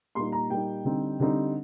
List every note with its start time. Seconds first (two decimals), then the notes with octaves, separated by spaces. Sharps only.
0.15 A#2 G3 A#3 D#4 C6
0.32 A#5
0.50 A#2 G3 A#3 D#4 G5
0.84 D3 G3 C4 D#4
1.20 D3 G3 C4 D#4